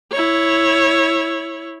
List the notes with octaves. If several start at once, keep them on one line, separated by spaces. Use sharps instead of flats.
E4 C#5